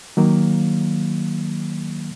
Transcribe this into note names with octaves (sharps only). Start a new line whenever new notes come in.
D#3 F#3 A#3